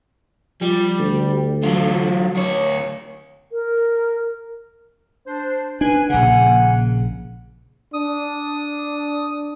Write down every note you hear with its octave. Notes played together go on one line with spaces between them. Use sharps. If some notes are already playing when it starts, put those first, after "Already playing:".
F3 G3
D2
F#3 F4
D2 C#5
A#4
D4 C5
D4 B4 G#5
A#1 C#3 A#3 F#5 G#5
D4 D#6